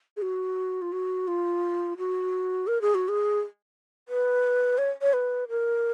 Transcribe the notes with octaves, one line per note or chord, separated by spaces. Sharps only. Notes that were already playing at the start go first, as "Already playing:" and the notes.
G#4
F#4
F4
F#4
F4
F#4
A#4
G#4
F#4
G#4
B4
C#5
C#5
B4
A#4